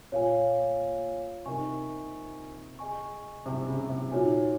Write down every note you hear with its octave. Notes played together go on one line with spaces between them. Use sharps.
A#2 C#5 F5 G#5
C3 D#4 A#4 D#5 G#5 C#6
G#4 D#5 G#5 C#6
C3
C#3
C3
A#2 D#4 F#4 C#5 G#5